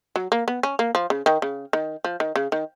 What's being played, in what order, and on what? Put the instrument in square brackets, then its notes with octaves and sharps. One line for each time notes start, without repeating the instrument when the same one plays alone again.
[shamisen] F#3
A#3
B3
C#4
A#3
F3
C#3
D#3
C#3
D#3
F3
D#3
C#3
D#3